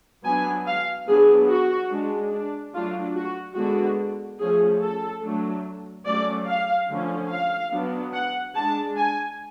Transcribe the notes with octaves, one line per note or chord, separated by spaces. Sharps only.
F#3 B3 D4 G#5
F5
F#3 B3 D4 G#4
F#4
G#3 D4
D4
F#3 A3 D4 F4
F#4
D3 G#3 B3 D4 F#4
F3 A3 C#4 G#4
A4
F#3 A3 D4
F#3 A3 C#4 D5
F5
D3 F3 A3 C#4
F5
F#3 B3 D4
F#5
G#3 D4 A5
G#5